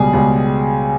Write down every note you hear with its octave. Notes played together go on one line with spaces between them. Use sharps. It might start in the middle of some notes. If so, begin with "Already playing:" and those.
Already playing: C#2 B2 G3 G#4
C#2 B2 G3